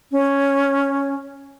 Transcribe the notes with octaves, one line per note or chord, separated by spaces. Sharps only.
C#4